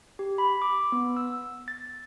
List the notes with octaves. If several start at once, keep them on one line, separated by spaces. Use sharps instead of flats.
G4
B5
D6
B3
E6
A6